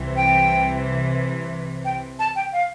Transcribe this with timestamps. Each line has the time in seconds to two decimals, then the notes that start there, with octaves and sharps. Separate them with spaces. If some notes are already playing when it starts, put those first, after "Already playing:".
Already playing: C2 C3 E3
0.16 G5
1.85 G5
2.19 A5
2.36 G5
2.53 F5